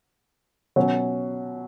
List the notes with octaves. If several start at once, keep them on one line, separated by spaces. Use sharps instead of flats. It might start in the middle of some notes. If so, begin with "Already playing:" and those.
B2 F#3 C#4